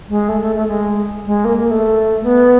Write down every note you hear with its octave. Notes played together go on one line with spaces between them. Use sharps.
G#3
A3
A3
A3
G#3
G#3
A#3
A#3
A3
B3